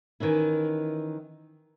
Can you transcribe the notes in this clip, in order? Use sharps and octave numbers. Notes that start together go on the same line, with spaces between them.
D#3 E3 C#4 E4